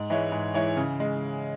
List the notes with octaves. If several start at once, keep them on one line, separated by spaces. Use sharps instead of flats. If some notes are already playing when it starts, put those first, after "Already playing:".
Already playing: G#2
E3 G#3 E4 C#5
G#2
E3 G#3 E4 C#5
C#3
G#3